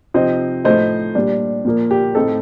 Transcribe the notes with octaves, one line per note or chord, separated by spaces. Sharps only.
C3 F3 C4 D#4 C5 D#5
A2 F3 A3 D#4 C5 D#5
A#2 G3 D4
A#2 F3 A#3
G4
A2 A3 C4 D#4 A4